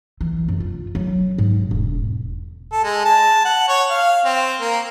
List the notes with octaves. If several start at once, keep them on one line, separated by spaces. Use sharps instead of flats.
E3
F#2
F4
F#3
G#2
E1
A4
G#3
A5
F#5
C#5
F5
C4
A#3